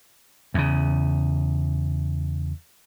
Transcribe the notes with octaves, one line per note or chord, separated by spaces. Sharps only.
E2 C#3